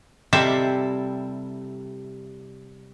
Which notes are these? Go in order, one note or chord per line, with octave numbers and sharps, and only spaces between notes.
C3 G3 C4 E4 A4 E5